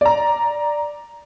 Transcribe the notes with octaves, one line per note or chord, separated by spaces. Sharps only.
D5 A#5